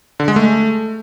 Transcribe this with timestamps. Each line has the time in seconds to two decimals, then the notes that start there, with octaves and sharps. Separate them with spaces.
0.20 D3
0.28 G#3
0.36 A3